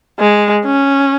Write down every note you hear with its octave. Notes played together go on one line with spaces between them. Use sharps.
G#3
C#4